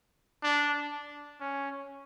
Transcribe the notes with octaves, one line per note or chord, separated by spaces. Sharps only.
D4
C#4